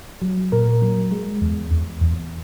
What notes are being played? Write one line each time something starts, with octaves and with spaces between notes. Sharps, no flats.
F#3
A#2 A#4
F#3
G#3
E2
E2
E2